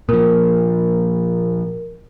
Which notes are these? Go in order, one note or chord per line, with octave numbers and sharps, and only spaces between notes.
A#2 F3 A#4